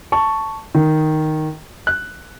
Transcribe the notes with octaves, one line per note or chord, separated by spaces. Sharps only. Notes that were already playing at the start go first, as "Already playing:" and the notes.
A5 C#6
D#3
F#6